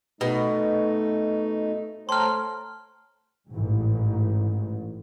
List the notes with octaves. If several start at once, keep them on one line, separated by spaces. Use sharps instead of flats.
B2 A3 D#4
A3 C5 C#5 G5 A5 A#5 C6 F6
A1 G#2